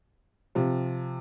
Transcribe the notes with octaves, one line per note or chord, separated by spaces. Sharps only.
C3 F3